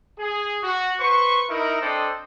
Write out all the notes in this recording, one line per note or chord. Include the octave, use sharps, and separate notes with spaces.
G#4
F#4
B4 C5 C#6
D#4 E4 A#4
C4 D4 A4 C5 D#5